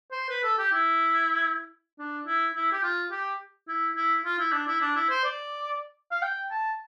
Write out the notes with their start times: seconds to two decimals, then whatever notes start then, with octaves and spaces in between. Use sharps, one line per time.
0.11 C5
0.29 B4
0.43 A4
0.58 G4
0.73 E4
1.99 D4
2.27 E4
2.55 E4
2.72 G4
2.83 F4
3.11 G4
3.68 E4
3.96 E4
4.25 F4
4.39 E4
4.52 D4
4.67 E4
4.81 D4
4.96 E4
5.10 C5
5.24 D5
6.11 F5
6.22 G5
6.51 A5